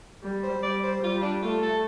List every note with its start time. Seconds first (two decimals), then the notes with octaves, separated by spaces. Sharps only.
0.23 G3
0.43 C5
0.63 G3 D5
0.84 C5
1.02 G3 F4
1.22 D4
1.42 A3 F4
1.62 A4